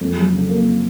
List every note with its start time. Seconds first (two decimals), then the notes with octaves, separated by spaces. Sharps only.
0.01 F2
0.17 F#3
0.33 C#3
0.50 A#3